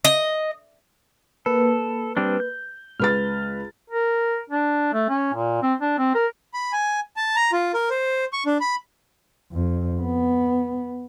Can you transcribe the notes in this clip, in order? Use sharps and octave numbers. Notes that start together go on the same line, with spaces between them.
D#5
A#3 A4 B4
G3 C4 D4
G6
C#2 B4 F6 A6
A#4
D4
A3
C#4
A#2
C4
D4
C4
A#4
B5
G#5
A5
A#5
F4
A#4
C5
C#6
D4
B5
F2
B3